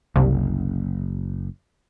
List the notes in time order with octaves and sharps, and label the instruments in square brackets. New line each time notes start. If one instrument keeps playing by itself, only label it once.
[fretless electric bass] F#1 [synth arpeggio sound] C2